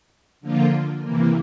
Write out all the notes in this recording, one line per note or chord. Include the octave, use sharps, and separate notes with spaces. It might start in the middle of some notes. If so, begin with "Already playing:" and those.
D3 F3 A#3 F4
C3 E3 A#3